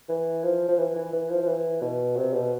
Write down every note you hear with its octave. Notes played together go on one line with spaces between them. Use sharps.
E3
F3
F3
E3
E3
E3
F3
F3
E3
B2
C3
B2